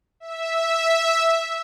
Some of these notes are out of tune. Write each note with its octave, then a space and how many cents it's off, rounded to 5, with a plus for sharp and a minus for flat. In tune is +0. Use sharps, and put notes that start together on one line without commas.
E5 -5